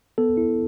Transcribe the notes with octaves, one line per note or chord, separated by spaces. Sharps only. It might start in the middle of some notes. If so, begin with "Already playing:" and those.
B3 A4
E4